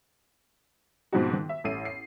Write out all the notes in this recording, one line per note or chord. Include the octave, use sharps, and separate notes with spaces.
G#2 B2 F3 C4 D#4 F#4
D#3
E5
A1 E4 A4 C7 D#7
C7